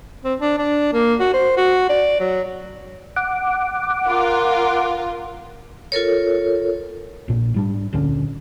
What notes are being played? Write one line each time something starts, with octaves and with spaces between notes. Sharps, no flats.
C4
D4
D4
A#3
F#4
C5
F#4
D5
F#3
F#5 D6
F4 A#4
F4 A4 A#4 C#5
A#1 A#2
G#2 G3 D4
D1 A#1 D3 C#4